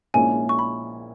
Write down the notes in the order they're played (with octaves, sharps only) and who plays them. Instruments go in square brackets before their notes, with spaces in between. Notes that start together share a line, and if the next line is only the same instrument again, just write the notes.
[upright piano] A#1 A#2 G#3 C#4 E4 [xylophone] G#5
[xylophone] C#6
B5